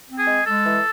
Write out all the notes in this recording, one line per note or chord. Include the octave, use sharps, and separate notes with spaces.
C4
G#4
G#3
G#3 A4
E3